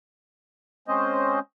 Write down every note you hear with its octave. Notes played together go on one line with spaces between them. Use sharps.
G#3 C4 C#4 C5 D#5